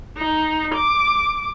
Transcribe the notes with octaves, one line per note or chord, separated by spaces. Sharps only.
D#4
D6